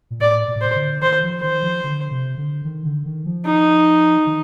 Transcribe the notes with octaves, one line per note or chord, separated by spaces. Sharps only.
A#2
A2 D5
A#2
A2
A#2 C5
D3
D#3 C5
F3
D#3 C5
F3
D3
C3
D3
D#3
D3
D#3
F3
D#4
D#3